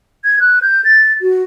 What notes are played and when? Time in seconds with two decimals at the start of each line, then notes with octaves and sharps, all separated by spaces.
0.25 G#6
0.40 F#6
0.62 G6
0.85 A6
1.21 F#4